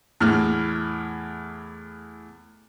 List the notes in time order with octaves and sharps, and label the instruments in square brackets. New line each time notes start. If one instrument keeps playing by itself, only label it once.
[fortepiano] E2 A2 F6